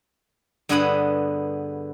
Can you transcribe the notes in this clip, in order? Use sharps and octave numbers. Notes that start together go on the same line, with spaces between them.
G2 D3 B3 G#4 B4 B5